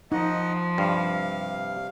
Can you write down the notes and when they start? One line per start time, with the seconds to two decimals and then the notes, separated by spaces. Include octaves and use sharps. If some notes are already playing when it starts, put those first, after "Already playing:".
0.12 F3 D#4 D#5 F#5
0.78 G2 C3 F5